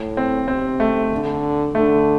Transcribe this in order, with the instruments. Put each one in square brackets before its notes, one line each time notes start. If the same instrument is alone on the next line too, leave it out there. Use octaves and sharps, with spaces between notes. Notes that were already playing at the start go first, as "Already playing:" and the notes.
Already playing: [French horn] A2
[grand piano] C4
[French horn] C3 [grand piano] C4
[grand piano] A3
[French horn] D3
[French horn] D3 [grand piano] A3